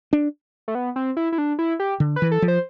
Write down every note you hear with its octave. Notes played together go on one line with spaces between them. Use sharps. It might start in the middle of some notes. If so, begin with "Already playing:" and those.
D4
A3
B3
C4
E4
E4
D4
E4
G4
D3
B4
E3
A4
F3
C5